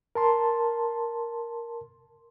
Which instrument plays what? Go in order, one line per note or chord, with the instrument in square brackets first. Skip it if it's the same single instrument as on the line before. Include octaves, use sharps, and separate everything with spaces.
[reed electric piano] A#4 A5 C6